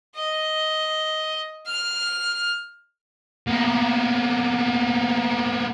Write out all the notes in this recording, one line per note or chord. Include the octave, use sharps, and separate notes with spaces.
D#5
F6
A#3 B3